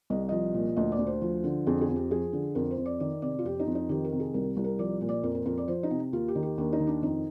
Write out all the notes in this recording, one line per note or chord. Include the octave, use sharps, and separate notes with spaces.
C2 D#5
F3 D#5
A#2
D2 D#5
D5
D2
C5
F3
D3
F2 G#4
G#4
F2
G4
F3 G#4
D3
F2 A#4
C5
F2
D5
D#3 D5
C3 D5
F4
F2 G4
D#4
F2
D#4
D#3 G4
A#4
C3
G#4
C2 A#4
C2
A#4
F3 D5
A#2
D5
F2 A#4
A#4
F2 A#4
D5
F3 C5
D#4
C3
D#2 F4
G4
D#3
G4
D#2 D4
D#4
D#3
D4
F2 D#4